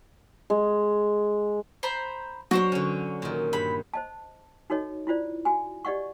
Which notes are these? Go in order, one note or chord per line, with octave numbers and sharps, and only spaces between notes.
G#3
C5 A#5 B5
F#3 D4 F#4 C5 C#5
D3 C#4
A#2 D#3
G2 B5
C5 D#5 A5
D#4 F#4 A4 C#5 D#5
E4 F4 C5 D5
F#4 G#5
G4 D5 D#5 F#5 C#6